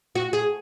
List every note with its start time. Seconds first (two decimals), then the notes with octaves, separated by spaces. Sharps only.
0.15 F#4
0.33 G#4